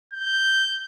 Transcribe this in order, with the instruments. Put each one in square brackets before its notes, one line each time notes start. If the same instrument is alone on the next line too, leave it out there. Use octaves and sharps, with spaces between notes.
[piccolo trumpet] G6